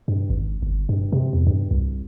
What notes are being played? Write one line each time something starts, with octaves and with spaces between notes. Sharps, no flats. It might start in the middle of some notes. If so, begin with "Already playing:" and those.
G2
G#1
G1
G2
C3
E2
G2
C2